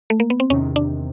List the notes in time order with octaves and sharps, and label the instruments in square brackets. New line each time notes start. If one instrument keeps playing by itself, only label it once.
[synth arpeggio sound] A3
A#3
B3
C4
[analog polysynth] E2 C3 D#3 [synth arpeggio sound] C#4
[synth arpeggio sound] D4